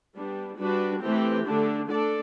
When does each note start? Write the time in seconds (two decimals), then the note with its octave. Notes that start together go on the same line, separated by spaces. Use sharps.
0.15 G3 B3 D4
0.58 G3 D4 F#4 B4
1.01 E3 A3 C4 G4
1.45 D3 A3 D4
1.88 A3 D4 A4 D5